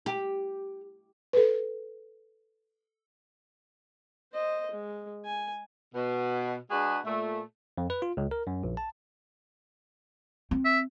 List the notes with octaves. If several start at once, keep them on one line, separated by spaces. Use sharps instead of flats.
G4
A4 B4
C5 D#5
G#3
G#5
B2
G#3 D4 F#4 G#4 B4
A#2 A3
F2
B4
F4
C#2
A#4
F#2
A#1
A5
C4
E5